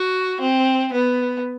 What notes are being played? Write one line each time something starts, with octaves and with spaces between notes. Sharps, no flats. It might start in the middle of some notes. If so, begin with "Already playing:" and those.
Already playing: F#4
C4
B3